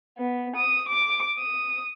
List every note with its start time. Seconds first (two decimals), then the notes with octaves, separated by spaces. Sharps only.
0.18 B3
0.56 D#6
0.88 D6
1.38 D#6